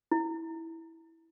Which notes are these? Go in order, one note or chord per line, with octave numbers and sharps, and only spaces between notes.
E4